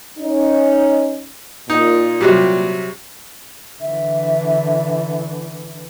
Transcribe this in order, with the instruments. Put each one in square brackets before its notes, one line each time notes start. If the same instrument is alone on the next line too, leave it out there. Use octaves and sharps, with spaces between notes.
[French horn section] C#4 D#4
[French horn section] A#2 [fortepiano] D#4
[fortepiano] C3 F#3 G3
[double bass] D3 E3 [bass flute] E5